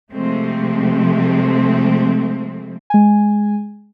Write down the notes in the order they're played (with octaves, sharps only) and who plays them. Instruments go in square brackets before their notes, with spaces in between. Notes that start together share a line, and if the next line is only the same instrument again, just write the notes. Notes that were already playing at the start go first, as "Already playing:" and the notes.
[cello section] C3 F3 G#3 A3 C4
[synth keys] G#3 G#5